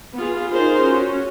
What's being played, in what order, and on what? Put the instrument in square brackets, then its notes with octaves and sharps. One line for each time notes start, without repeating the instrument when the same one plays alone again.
[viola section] B3 F4 G#4
D#4 F4 G#4 A#4 C5
C#4 F#4